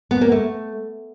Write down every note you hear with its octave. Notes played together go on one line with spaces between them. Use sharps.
B3
A#3
A3